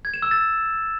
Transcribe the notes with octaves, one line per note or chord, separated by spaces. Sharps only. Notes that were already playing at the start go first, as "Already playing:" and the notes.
G#6
E7
E6
A6